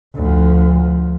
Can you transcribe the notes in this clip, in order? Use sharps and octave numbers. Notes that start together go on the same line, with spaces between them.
D2 F3